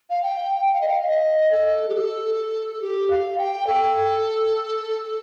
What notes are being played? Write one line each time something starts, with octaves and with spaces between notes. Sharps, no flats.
F5
G5
G5
F5
D#5
F5
F5
D#5
A4
G4
A4
G4
F5
G5
A4